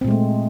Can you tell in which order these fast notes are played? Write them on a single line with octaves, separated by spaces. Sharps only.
C4 A#2 G#3 A3